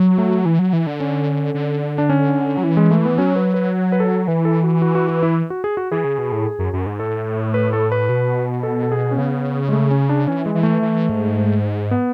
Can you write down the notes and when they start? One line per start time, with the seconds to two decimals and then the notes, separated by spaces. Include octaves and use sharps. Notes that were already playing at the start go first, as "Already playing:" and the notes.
Already playing: F#3
0.18 A3
0.45 E3
0.59 F#3
0.73 E3
0.87 D3
1.00 C#4
1.54 D3
1.98 D4
2.10 C#4
2.57 F#3
2.64 E3
2.77 G#3
2.91 A3
3.05 B3
3.18 F#3 C#4
3.36 B4
3.54 B4
3.92 B4
4.00 A4
4.28 E3 B4
4.45 A4
4.63 F#4
4.82 F#4
4.95 F#4
5.09 F#4
5.23 E4
5.50 F#4
5.64 G#4
5.77 F#4
5.91 E3 G#4
6.04 C#3
6.18 B2
6.32 A2
6.59 F#2
6.73 F#2
6.86 G#2
7.00 A2 A4
7.54 B4
7.73 A4
7.92 B4
8.09 B2
8.63 A4
8.83 A4
8.92 G#4
9.11 C#4
9.18 C#3 B3
9.69 G#3
9.73 A3
9.91 C#4
10.09 D4
10.27 E3 C#4
10.46 G#3
10.55 E3
10.63 A3
10.82 E3
11.09 G#2
11.91 B3